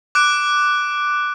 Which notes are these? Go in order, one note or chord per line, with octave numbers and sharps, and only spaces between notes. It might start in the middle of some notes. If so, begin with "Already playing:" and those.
D6 F#6 D7